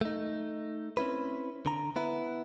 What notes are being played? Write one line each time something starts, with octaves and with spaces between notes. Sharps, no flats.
A3 D#4
C4 C#4 E4 B4
D3 A#5
B3 E4 B4